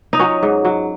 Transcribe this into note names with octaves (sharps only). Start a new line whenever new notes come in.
D#4
F#3 C#4
G#2
F#3